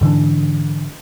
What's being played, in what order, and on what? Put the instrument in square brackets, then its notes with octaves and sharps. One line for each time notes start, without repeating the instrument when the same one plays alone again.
[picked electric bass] G#2 D3 E3 D4